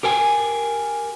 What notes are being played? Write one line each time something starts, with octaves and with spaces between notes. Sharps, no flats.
G4 A#4 G5 G#5